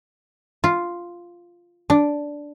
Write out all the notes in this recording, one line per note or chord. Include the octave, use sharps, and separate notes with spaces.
F4
D4